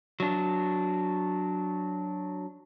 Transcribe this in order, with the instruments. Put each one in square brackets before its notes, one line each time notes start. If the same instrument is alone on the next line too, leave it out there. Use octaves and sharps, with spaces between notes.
[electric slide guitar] F#3 D4